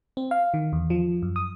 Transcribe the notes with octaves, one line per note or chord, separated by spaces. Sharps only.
C4
F5
D#3
E2
F3
F#2
D#6